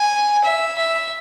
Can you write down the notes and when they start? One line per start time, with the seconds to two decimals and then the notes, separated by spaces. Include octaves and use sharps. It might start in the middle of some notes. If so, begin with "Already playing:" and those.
Already playing: G#5
0.44 E5
0.78 E5